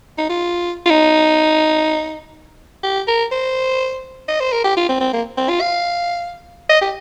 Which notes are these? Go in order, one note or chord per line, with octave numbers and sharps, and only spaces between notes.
D#4
F4
F4
D#4
G4
A#4
C5
D#5
C5
A#4
G4
F4
C4
C4
A#3
C4
F4
F5
D#5
G4